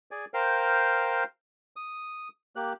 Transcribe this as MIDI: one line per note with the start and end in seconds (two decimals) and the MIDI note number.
0.11 0.25 68
0.11 0.25 74
0.11 0.25 80
0.34 1.24 70
0.34 1.24 72
0.34 1.24 77
0.34 1.24 79
1.76 2.28 87
2.56 2.73 58
2.56 2.73 67
2.56 2.73 90